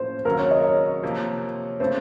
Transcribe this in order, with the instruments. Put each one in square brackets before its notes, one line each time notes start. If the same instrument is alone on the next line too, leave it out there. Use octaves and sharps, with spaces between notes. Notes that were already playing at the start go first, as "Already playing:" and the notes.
Already playing: [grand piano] A2 F3 A#3 C#4 F4 [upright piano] C5
[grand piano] D#2 C#3 F#3 [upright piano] A#4
[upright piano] C#5
D#5
C#5
[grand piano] C3 F3 A#3
[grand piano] C#3 A3 C4 [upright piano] C5